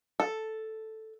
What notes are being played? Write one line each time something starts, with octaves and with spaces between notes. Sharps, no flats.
A4